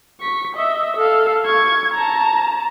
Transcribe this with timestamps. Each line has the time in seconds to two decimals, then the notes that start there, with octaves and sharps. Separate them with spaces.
0.21 C#6 B6
0.56 D#5 E5
0.97 A4 F5
1.46 C#6 G#6
1.94 A5 A#5